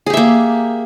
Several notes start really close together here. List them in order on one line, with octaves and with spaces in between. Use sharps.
G#4 G4 E5 A#3